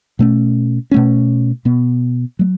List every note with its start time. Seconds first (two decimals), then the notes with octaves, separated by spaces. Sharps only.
0.19 B2 A3 C#4
0.91 B2 A3 C#4
1.65 B2 B3
2.39 F#3 A3